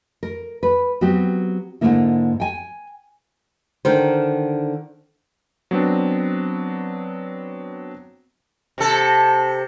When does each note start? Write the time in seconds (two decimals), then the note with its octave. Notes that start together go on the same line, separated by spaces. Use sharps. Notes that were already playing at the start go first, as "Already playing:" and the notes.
0.23 A#4
0.63 B4
1.01 F#3 B3 C4 G4
1.81 G#2 B2 D3 G#3 A#3 E4
2.40 G5 G#5
3.85 D3 D#3 C5
5.71 F#3 B3 C4 D4
8.78 C3 A4